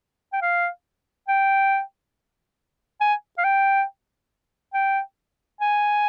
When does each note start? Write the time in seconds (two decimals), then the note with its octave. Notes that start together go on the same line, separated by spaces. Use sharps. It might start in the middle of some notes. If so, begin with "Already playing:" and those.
0.33 G5
0.42 F5
1.28 G5
3.01 G#5
3.38 F5
3.44 G5
4.74 G5
5.61 G#5